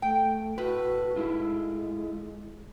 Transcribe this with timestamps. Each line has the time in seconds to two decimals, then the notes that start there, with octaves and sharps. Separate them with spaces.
0.02 A3 G5
0.58 A2 F#4 B4
1.16 G#3 E4 F4